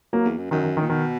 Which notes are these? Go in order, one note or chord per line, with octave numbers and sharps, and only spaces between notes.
F#3 A#3
E2
F#2
F#2 D#3
D#3
D#3
A#2
B2 D#3